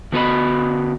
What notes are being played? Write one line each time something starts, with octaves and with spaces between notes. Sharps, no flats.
D3 B3 F#4 G4 D#5 B5